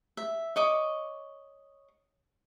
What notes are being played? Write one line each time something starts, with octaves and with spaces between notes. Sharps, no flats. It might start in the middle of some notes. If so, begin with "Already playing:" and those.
E5
C#5 D#5 D6